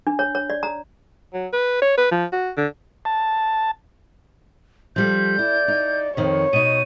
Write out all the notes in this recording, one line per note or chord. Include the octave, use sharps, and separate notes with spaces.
D4
C#5
C#5
D5
A#5
F#3
B4
C#5
B4
F3
F#4
D3
A5
F3 G3 A4 G6
E4 D5
D#4
F2 D#3 C#5
B2 D#4 D#7